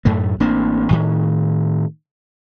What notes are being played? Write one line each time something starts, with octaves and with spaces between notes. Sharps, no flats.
F#2 A2 A3
A1 A#3 C4 D4
A2 D#3